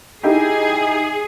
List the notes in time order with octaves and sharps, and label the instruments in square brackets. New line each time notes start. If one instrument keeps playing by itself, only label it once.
[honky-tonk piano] D#4 E4 G4 [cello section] G#4